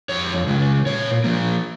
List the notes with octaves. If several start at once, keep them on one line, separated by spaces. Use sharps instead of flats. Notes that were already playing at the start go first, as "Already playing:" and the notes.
F2 C#5
C#3 G#3
A#2 C#5
F3 A#3